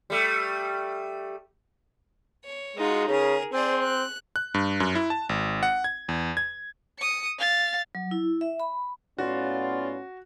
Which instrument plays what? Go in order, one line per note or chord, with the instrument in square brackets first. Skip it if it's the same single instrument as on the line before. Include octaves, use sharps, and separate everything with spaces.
[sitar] G3 A3
[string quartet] C#5
[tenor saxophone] G#3 [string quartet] D#4 F4 F#4
[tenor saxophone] C#3 [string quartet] G#4 A#4
[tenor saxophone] C4 [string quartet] G#4 C5 D5
[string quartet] F#6
[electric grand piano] F#6
G2
F#2
E4
A5
G#1
F#5
G#6
E2
G#6
[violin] D#6 C#7
F5 A6
[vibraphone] F#3
E4
E5
B5
[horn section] A2 B3 F4 [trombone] C#4 [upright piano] F#4 [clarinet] D5